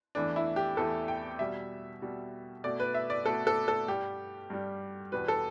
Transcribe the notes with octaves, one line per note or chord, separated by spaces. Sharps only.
E2 E3 A3 D4
E4
G4
E2 E3 A3 A4
G5
B2 G3 E5
B2 G3
B2 A3 D5
B4
E5
D5
B2 A3 A4
A4
A4
G2 G3 G4
G2 G3
E2 B2 G3 B4
A4